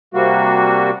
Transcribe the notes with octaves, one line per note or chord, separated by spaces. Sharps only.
C3 G3 A#3 F#4